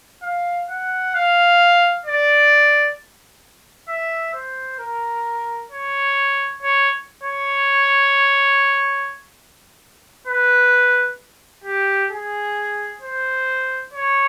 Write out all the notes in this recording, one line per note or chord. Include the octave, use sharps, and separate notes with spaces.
F5
F#5
F5
D5
E5
C5
A#4
C#5
C#5
C#5
B4
G4
G#4
C5
C#5